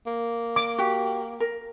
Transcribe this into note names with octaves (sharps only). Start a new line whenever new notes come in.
A#3
D6
F#4 G4
A#4